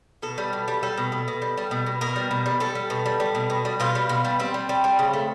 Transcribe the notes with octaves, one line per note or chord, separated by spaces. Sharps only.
B2 A4
G3
B2
G3
G3 A4
B2
B2
B2
G3
G3
B2
B2
B2 A#4
G3
B2
G3
G3 A4
G3
B2
G3
G3
B2
B2
G3
B2 F4
G3
B2
G3
G3 C4
G3
G3
G3
C#3
A3